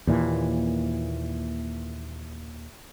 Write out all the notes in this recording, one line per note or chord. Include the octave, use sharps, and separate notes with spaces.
D#2 A#2 E3